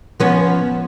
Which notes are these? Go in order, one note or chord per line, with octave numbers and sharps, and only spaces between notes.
F3 B3 C#4